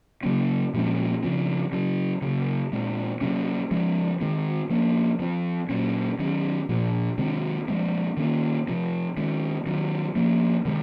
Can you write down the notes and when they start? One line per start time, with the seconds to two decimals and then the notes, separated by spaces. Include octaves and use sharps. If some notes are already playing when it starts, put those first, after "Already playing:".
0.23 C#3 F#3 A#3 C#4
0.74 A#2 F3 G#3 C#4
1.23 C#3 F3 C4
1.72 C#3 F#3 C#4
2.22 C#3 F#3 A#3
2.72 A#2 G#3 C4
3.21 C3 F#3 A#3 C#4
3.71 F3 G#3 C#4
4.21 D#3 G#3 C4
4.70 F3 A#3 C#4
5.19 F3 C4
5.69 A#2 F#3 C#4
6.19 D#3 F#3 C#4
6.69 A#2 F3 A#3
7.18 C3 D#3 G#3 C4
7.68 F3 G#3 C4
8.17 D#3 A#3 C#4
8.68 C3 F3 C4
9.17 D#3 G#3 C#4
9.66 D#3 F#3 C4
10.15 F3 A#3 C#4
10.65 C3 D#3 G#3